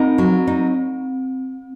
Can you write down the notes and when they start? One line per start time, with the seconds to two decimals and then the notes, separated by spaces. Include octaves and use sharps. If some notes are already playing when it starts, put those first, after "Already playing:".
Already playing: C4 D#4
0.18 F#3
0.47 D#4